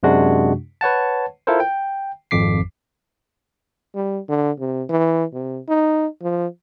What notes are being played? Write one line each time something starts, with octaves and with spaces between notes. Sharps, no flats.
F#2 C3 G#3 D4 F#4
B4 C#5 F#5 A5
E4 F4 A4 A#4 C5
G5
G#1 F2 D6 B6 C7
G3
D3
C3
E3
C3
D#4
F3